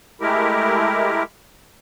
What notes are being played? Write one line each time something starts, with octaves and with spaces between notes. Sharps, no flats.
G#3 A3 E4 G4 A#4